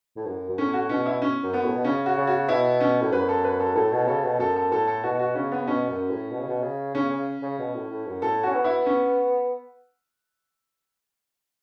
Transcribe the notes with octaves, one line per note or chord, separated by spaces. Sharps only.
A2
F#2
F#2
A2 C#4
F#4
B2 C#4
E4
C#4
F#2
B3
A2
B2
C#3 C#4
F#4
C#3
F#4
B2 E4
C#4
A2
F#2 B4
A4
B4
A4
A2 A4
B2
C#3 A4
B2
F#2 A4
A4
A2 A4
A4
B2 F#4
F#4
C#3 C#4
B3
B2 C#4
F#2
A2
B2
C#3
B2
C#3
C#3 C#4
C#3
C#3
B2
A2
A2
F#2
A2 A4
C#4 F#4
B3
E4
C#4